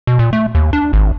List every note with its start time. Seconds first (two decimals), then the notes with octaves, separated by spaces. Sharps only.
0.07 B2
0.19 A#2
0.33 A3
0.55 D#2
0.73 D4
0.93 G#1